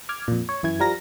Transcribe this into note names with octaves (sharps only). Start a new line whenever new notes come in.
D6 F6 G#6
F2 A#2
C#5
F#2 E3 G#6
F3 G3 A#4 A#6